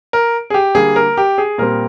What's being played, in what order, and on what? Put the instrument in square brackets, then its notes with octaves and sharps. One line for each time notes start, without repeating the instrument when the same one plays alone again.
[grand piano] A#4
G#4
G4
D3 G3 A#3 G#4
A#4
G4
G#4
A#2 G3 C4 A#4